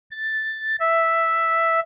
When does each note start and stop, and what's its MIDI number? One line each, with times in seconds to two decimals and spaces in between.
0.11 0.76 93
0.80 1.80 76